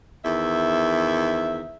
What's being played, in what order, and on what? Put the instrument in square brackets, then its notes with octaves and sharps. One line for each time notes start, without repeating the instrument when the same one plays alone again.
[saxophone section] E2 D#3 E5